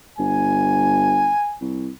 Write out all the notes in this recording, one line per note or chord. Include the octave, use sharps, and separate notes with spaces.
G1 G#5
C2